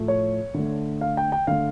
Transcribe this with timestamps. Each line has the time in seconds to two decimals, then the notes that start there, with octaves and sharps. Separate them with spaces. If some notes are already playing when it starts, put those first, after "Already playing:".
Already playing: A2 F3 A3
0.08 C#5
0.54 D3 A3
1.01 F5
1.17 G5
1.32 G5
1.47 D3 A3 F5